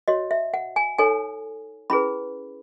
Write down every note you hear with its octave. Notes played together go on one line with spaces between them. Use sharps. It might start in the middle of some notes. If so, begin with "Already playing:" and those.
F#4 C#5 D#5
E5
F#5
G#5
D#4 A4 C#5 G#5
C#4 E4 G#4 B4 B5